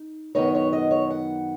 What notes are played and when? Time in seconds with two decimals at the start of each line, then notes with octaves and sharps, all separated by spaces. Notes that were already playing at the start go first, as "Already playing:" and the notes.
Already playing: D#4
0.35 F#2 D#3 B3 D#4 C#5
0.55 C#5
0.73 D#5
0.91 C#5
1.10 F#5